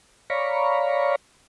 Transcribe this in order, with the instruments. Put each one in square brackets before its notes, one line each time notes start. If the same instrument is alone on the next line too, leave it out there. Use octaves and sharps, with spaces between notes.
[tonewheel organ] C#5 D5 F5 A#5 B5 C#6